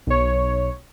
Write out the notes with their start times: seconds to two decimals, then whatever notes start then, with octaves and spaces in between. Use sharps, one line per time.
0.07 B1 C#5